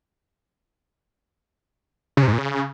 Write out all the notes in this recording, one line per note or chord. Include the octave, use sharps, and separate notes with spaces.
C#3
C3
G#2
A#2
C#3